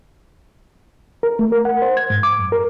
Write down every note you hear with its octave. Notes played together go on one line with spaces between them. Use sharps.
A#4
A3
A#4
F#5
C5
G#6
G#2
D6
F#2
A#4